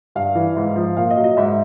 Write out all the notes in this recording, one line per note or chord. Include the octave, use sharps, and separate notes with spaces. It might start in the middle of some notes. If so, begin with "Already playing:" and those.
G2 F5
E3
G#2
F3
A#2 F5
D#5
F#3
D#5
G#2 E5